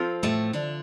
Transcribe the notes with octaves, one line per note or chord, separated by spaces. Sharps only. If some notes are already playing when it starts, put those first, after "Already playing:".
Already playing: F3 C4 F4 A4
A2 A3
D3 D4